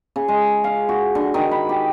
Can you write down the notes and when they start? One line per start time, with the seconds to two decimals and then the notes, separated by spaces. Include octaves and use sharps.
0.16 C#3
0.28 G#3
0.64 F5
0.89 F#4
1.15 D3
1.34 D#3
1.51 B5
1.69 G4